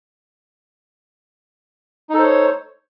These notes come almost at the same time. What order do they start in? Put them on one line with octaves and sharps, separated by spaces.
D#4 A4 C5 C#5